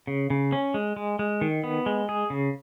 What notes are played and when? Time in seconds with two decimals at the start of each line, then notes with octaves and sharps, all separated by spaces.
0.07 C#3
0.30 C#3
0.52 C#4
0.74 G#3
0.97 G#3
1.19 G#3
1.41 D#3
1.64 B3
1.86 G#3
2.09 G#4
2.30 C#3